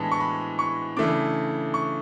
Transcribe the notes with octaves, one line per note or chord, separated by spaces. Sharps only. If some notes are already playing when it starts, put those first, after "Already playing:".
Already playing: A2 E3 G#3 B3 D4 A5
C#6
B5
C#6
C#3 E3 A3 D4 D6
C#6